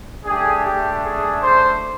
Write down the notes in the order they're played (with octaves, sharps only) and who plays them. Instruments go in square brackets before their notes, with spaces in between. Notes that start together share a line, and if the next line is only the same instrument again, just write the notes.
[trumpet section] A3 D4 G4 G#4
G4
G#4
C5